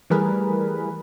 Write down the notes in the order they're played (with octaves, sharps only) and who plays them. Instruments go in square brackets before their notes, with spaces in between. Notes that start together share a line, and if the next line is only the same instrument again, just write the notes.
[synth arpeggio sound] E3 G3 A3 G#4 A#4 B4